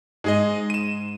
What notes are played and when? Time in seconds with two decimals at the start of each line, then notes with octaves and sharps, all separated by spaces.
0.24 G#2 G#3 G#4 D#5
0.70 D#7 E7